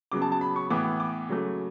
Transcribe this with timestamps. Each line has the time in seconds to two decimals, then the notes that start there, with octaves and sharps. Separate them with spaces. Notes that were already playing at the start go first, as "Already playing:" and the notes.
0.12 C#3 F#3 B3 D6
0.22 A5
0.32 A5
0.41 B5
0.56 C#6
0.70 A2 E3 B3 D6
1.00 D6
1.29 C#3 F#3 A3